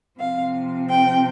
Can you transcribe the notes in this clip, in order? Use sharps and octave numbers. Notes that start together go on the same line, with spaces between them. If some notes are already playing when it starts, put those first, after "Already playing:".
C3 F3 C4 F5
G5